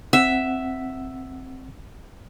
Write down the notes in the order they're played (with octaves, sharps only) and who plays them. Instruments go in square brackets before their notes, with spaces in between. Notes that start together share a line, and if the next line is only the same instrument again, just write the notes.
[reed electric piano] C4 F#5 [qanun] E5